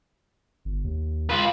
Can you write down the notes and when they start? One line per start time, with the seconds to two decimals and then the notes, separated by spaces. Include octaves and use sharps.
0.65 G1
0.84 D#2
1.30 F4 B4